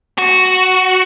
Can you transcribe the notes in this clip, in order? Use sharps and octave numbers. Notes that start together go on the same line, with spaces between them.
F#4